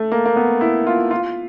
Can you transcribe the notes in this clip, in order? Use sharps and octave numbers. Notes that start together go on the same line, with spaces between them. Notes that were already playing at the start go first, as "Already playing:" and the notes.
Already playing: A3
A#3
A#3
B3
E4
F4
F4